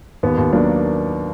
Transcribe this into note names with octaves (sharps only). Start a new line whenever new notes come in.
D#2 B3
D#2
F#3 A#3 D4